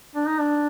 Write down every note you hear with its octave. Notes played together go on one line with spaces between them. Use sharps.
D4
D#4
D4